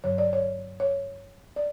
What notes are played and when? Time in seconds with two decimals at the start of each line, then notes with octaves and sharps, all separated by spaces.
0.04 G2 D3 F#3 C#5
0.18 D5
0.33 C#5
0.80 C#5
1.56 D5